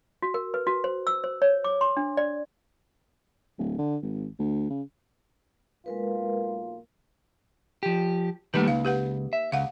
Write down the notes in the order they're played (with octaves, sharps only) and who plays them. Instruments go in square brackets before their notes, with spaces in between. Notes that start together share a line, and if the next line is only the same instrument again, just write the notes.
[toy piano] F#4
A#4
B4
F#4
C5
E6
C5
C#5
D6
C6
D4
D5
[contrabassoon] D1
D3
G#1
D2
C#3
[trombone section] B1 A#3 F4 [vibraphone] G#3 A#4 B4
[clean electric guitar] F3 G4
[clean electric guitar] D#3 G3 A3 [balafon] A#3 D#4 B4
[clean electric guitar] C#2 [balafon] F5
[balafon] G4 B4 F#5
[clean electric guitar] E5
[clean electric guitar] C#2 [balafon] F5 F#5